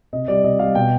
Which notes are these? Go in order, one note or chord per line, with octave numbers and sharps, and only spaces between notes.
C3 D#5
G3 D5
C3 D#5
G3 F5
B2 G5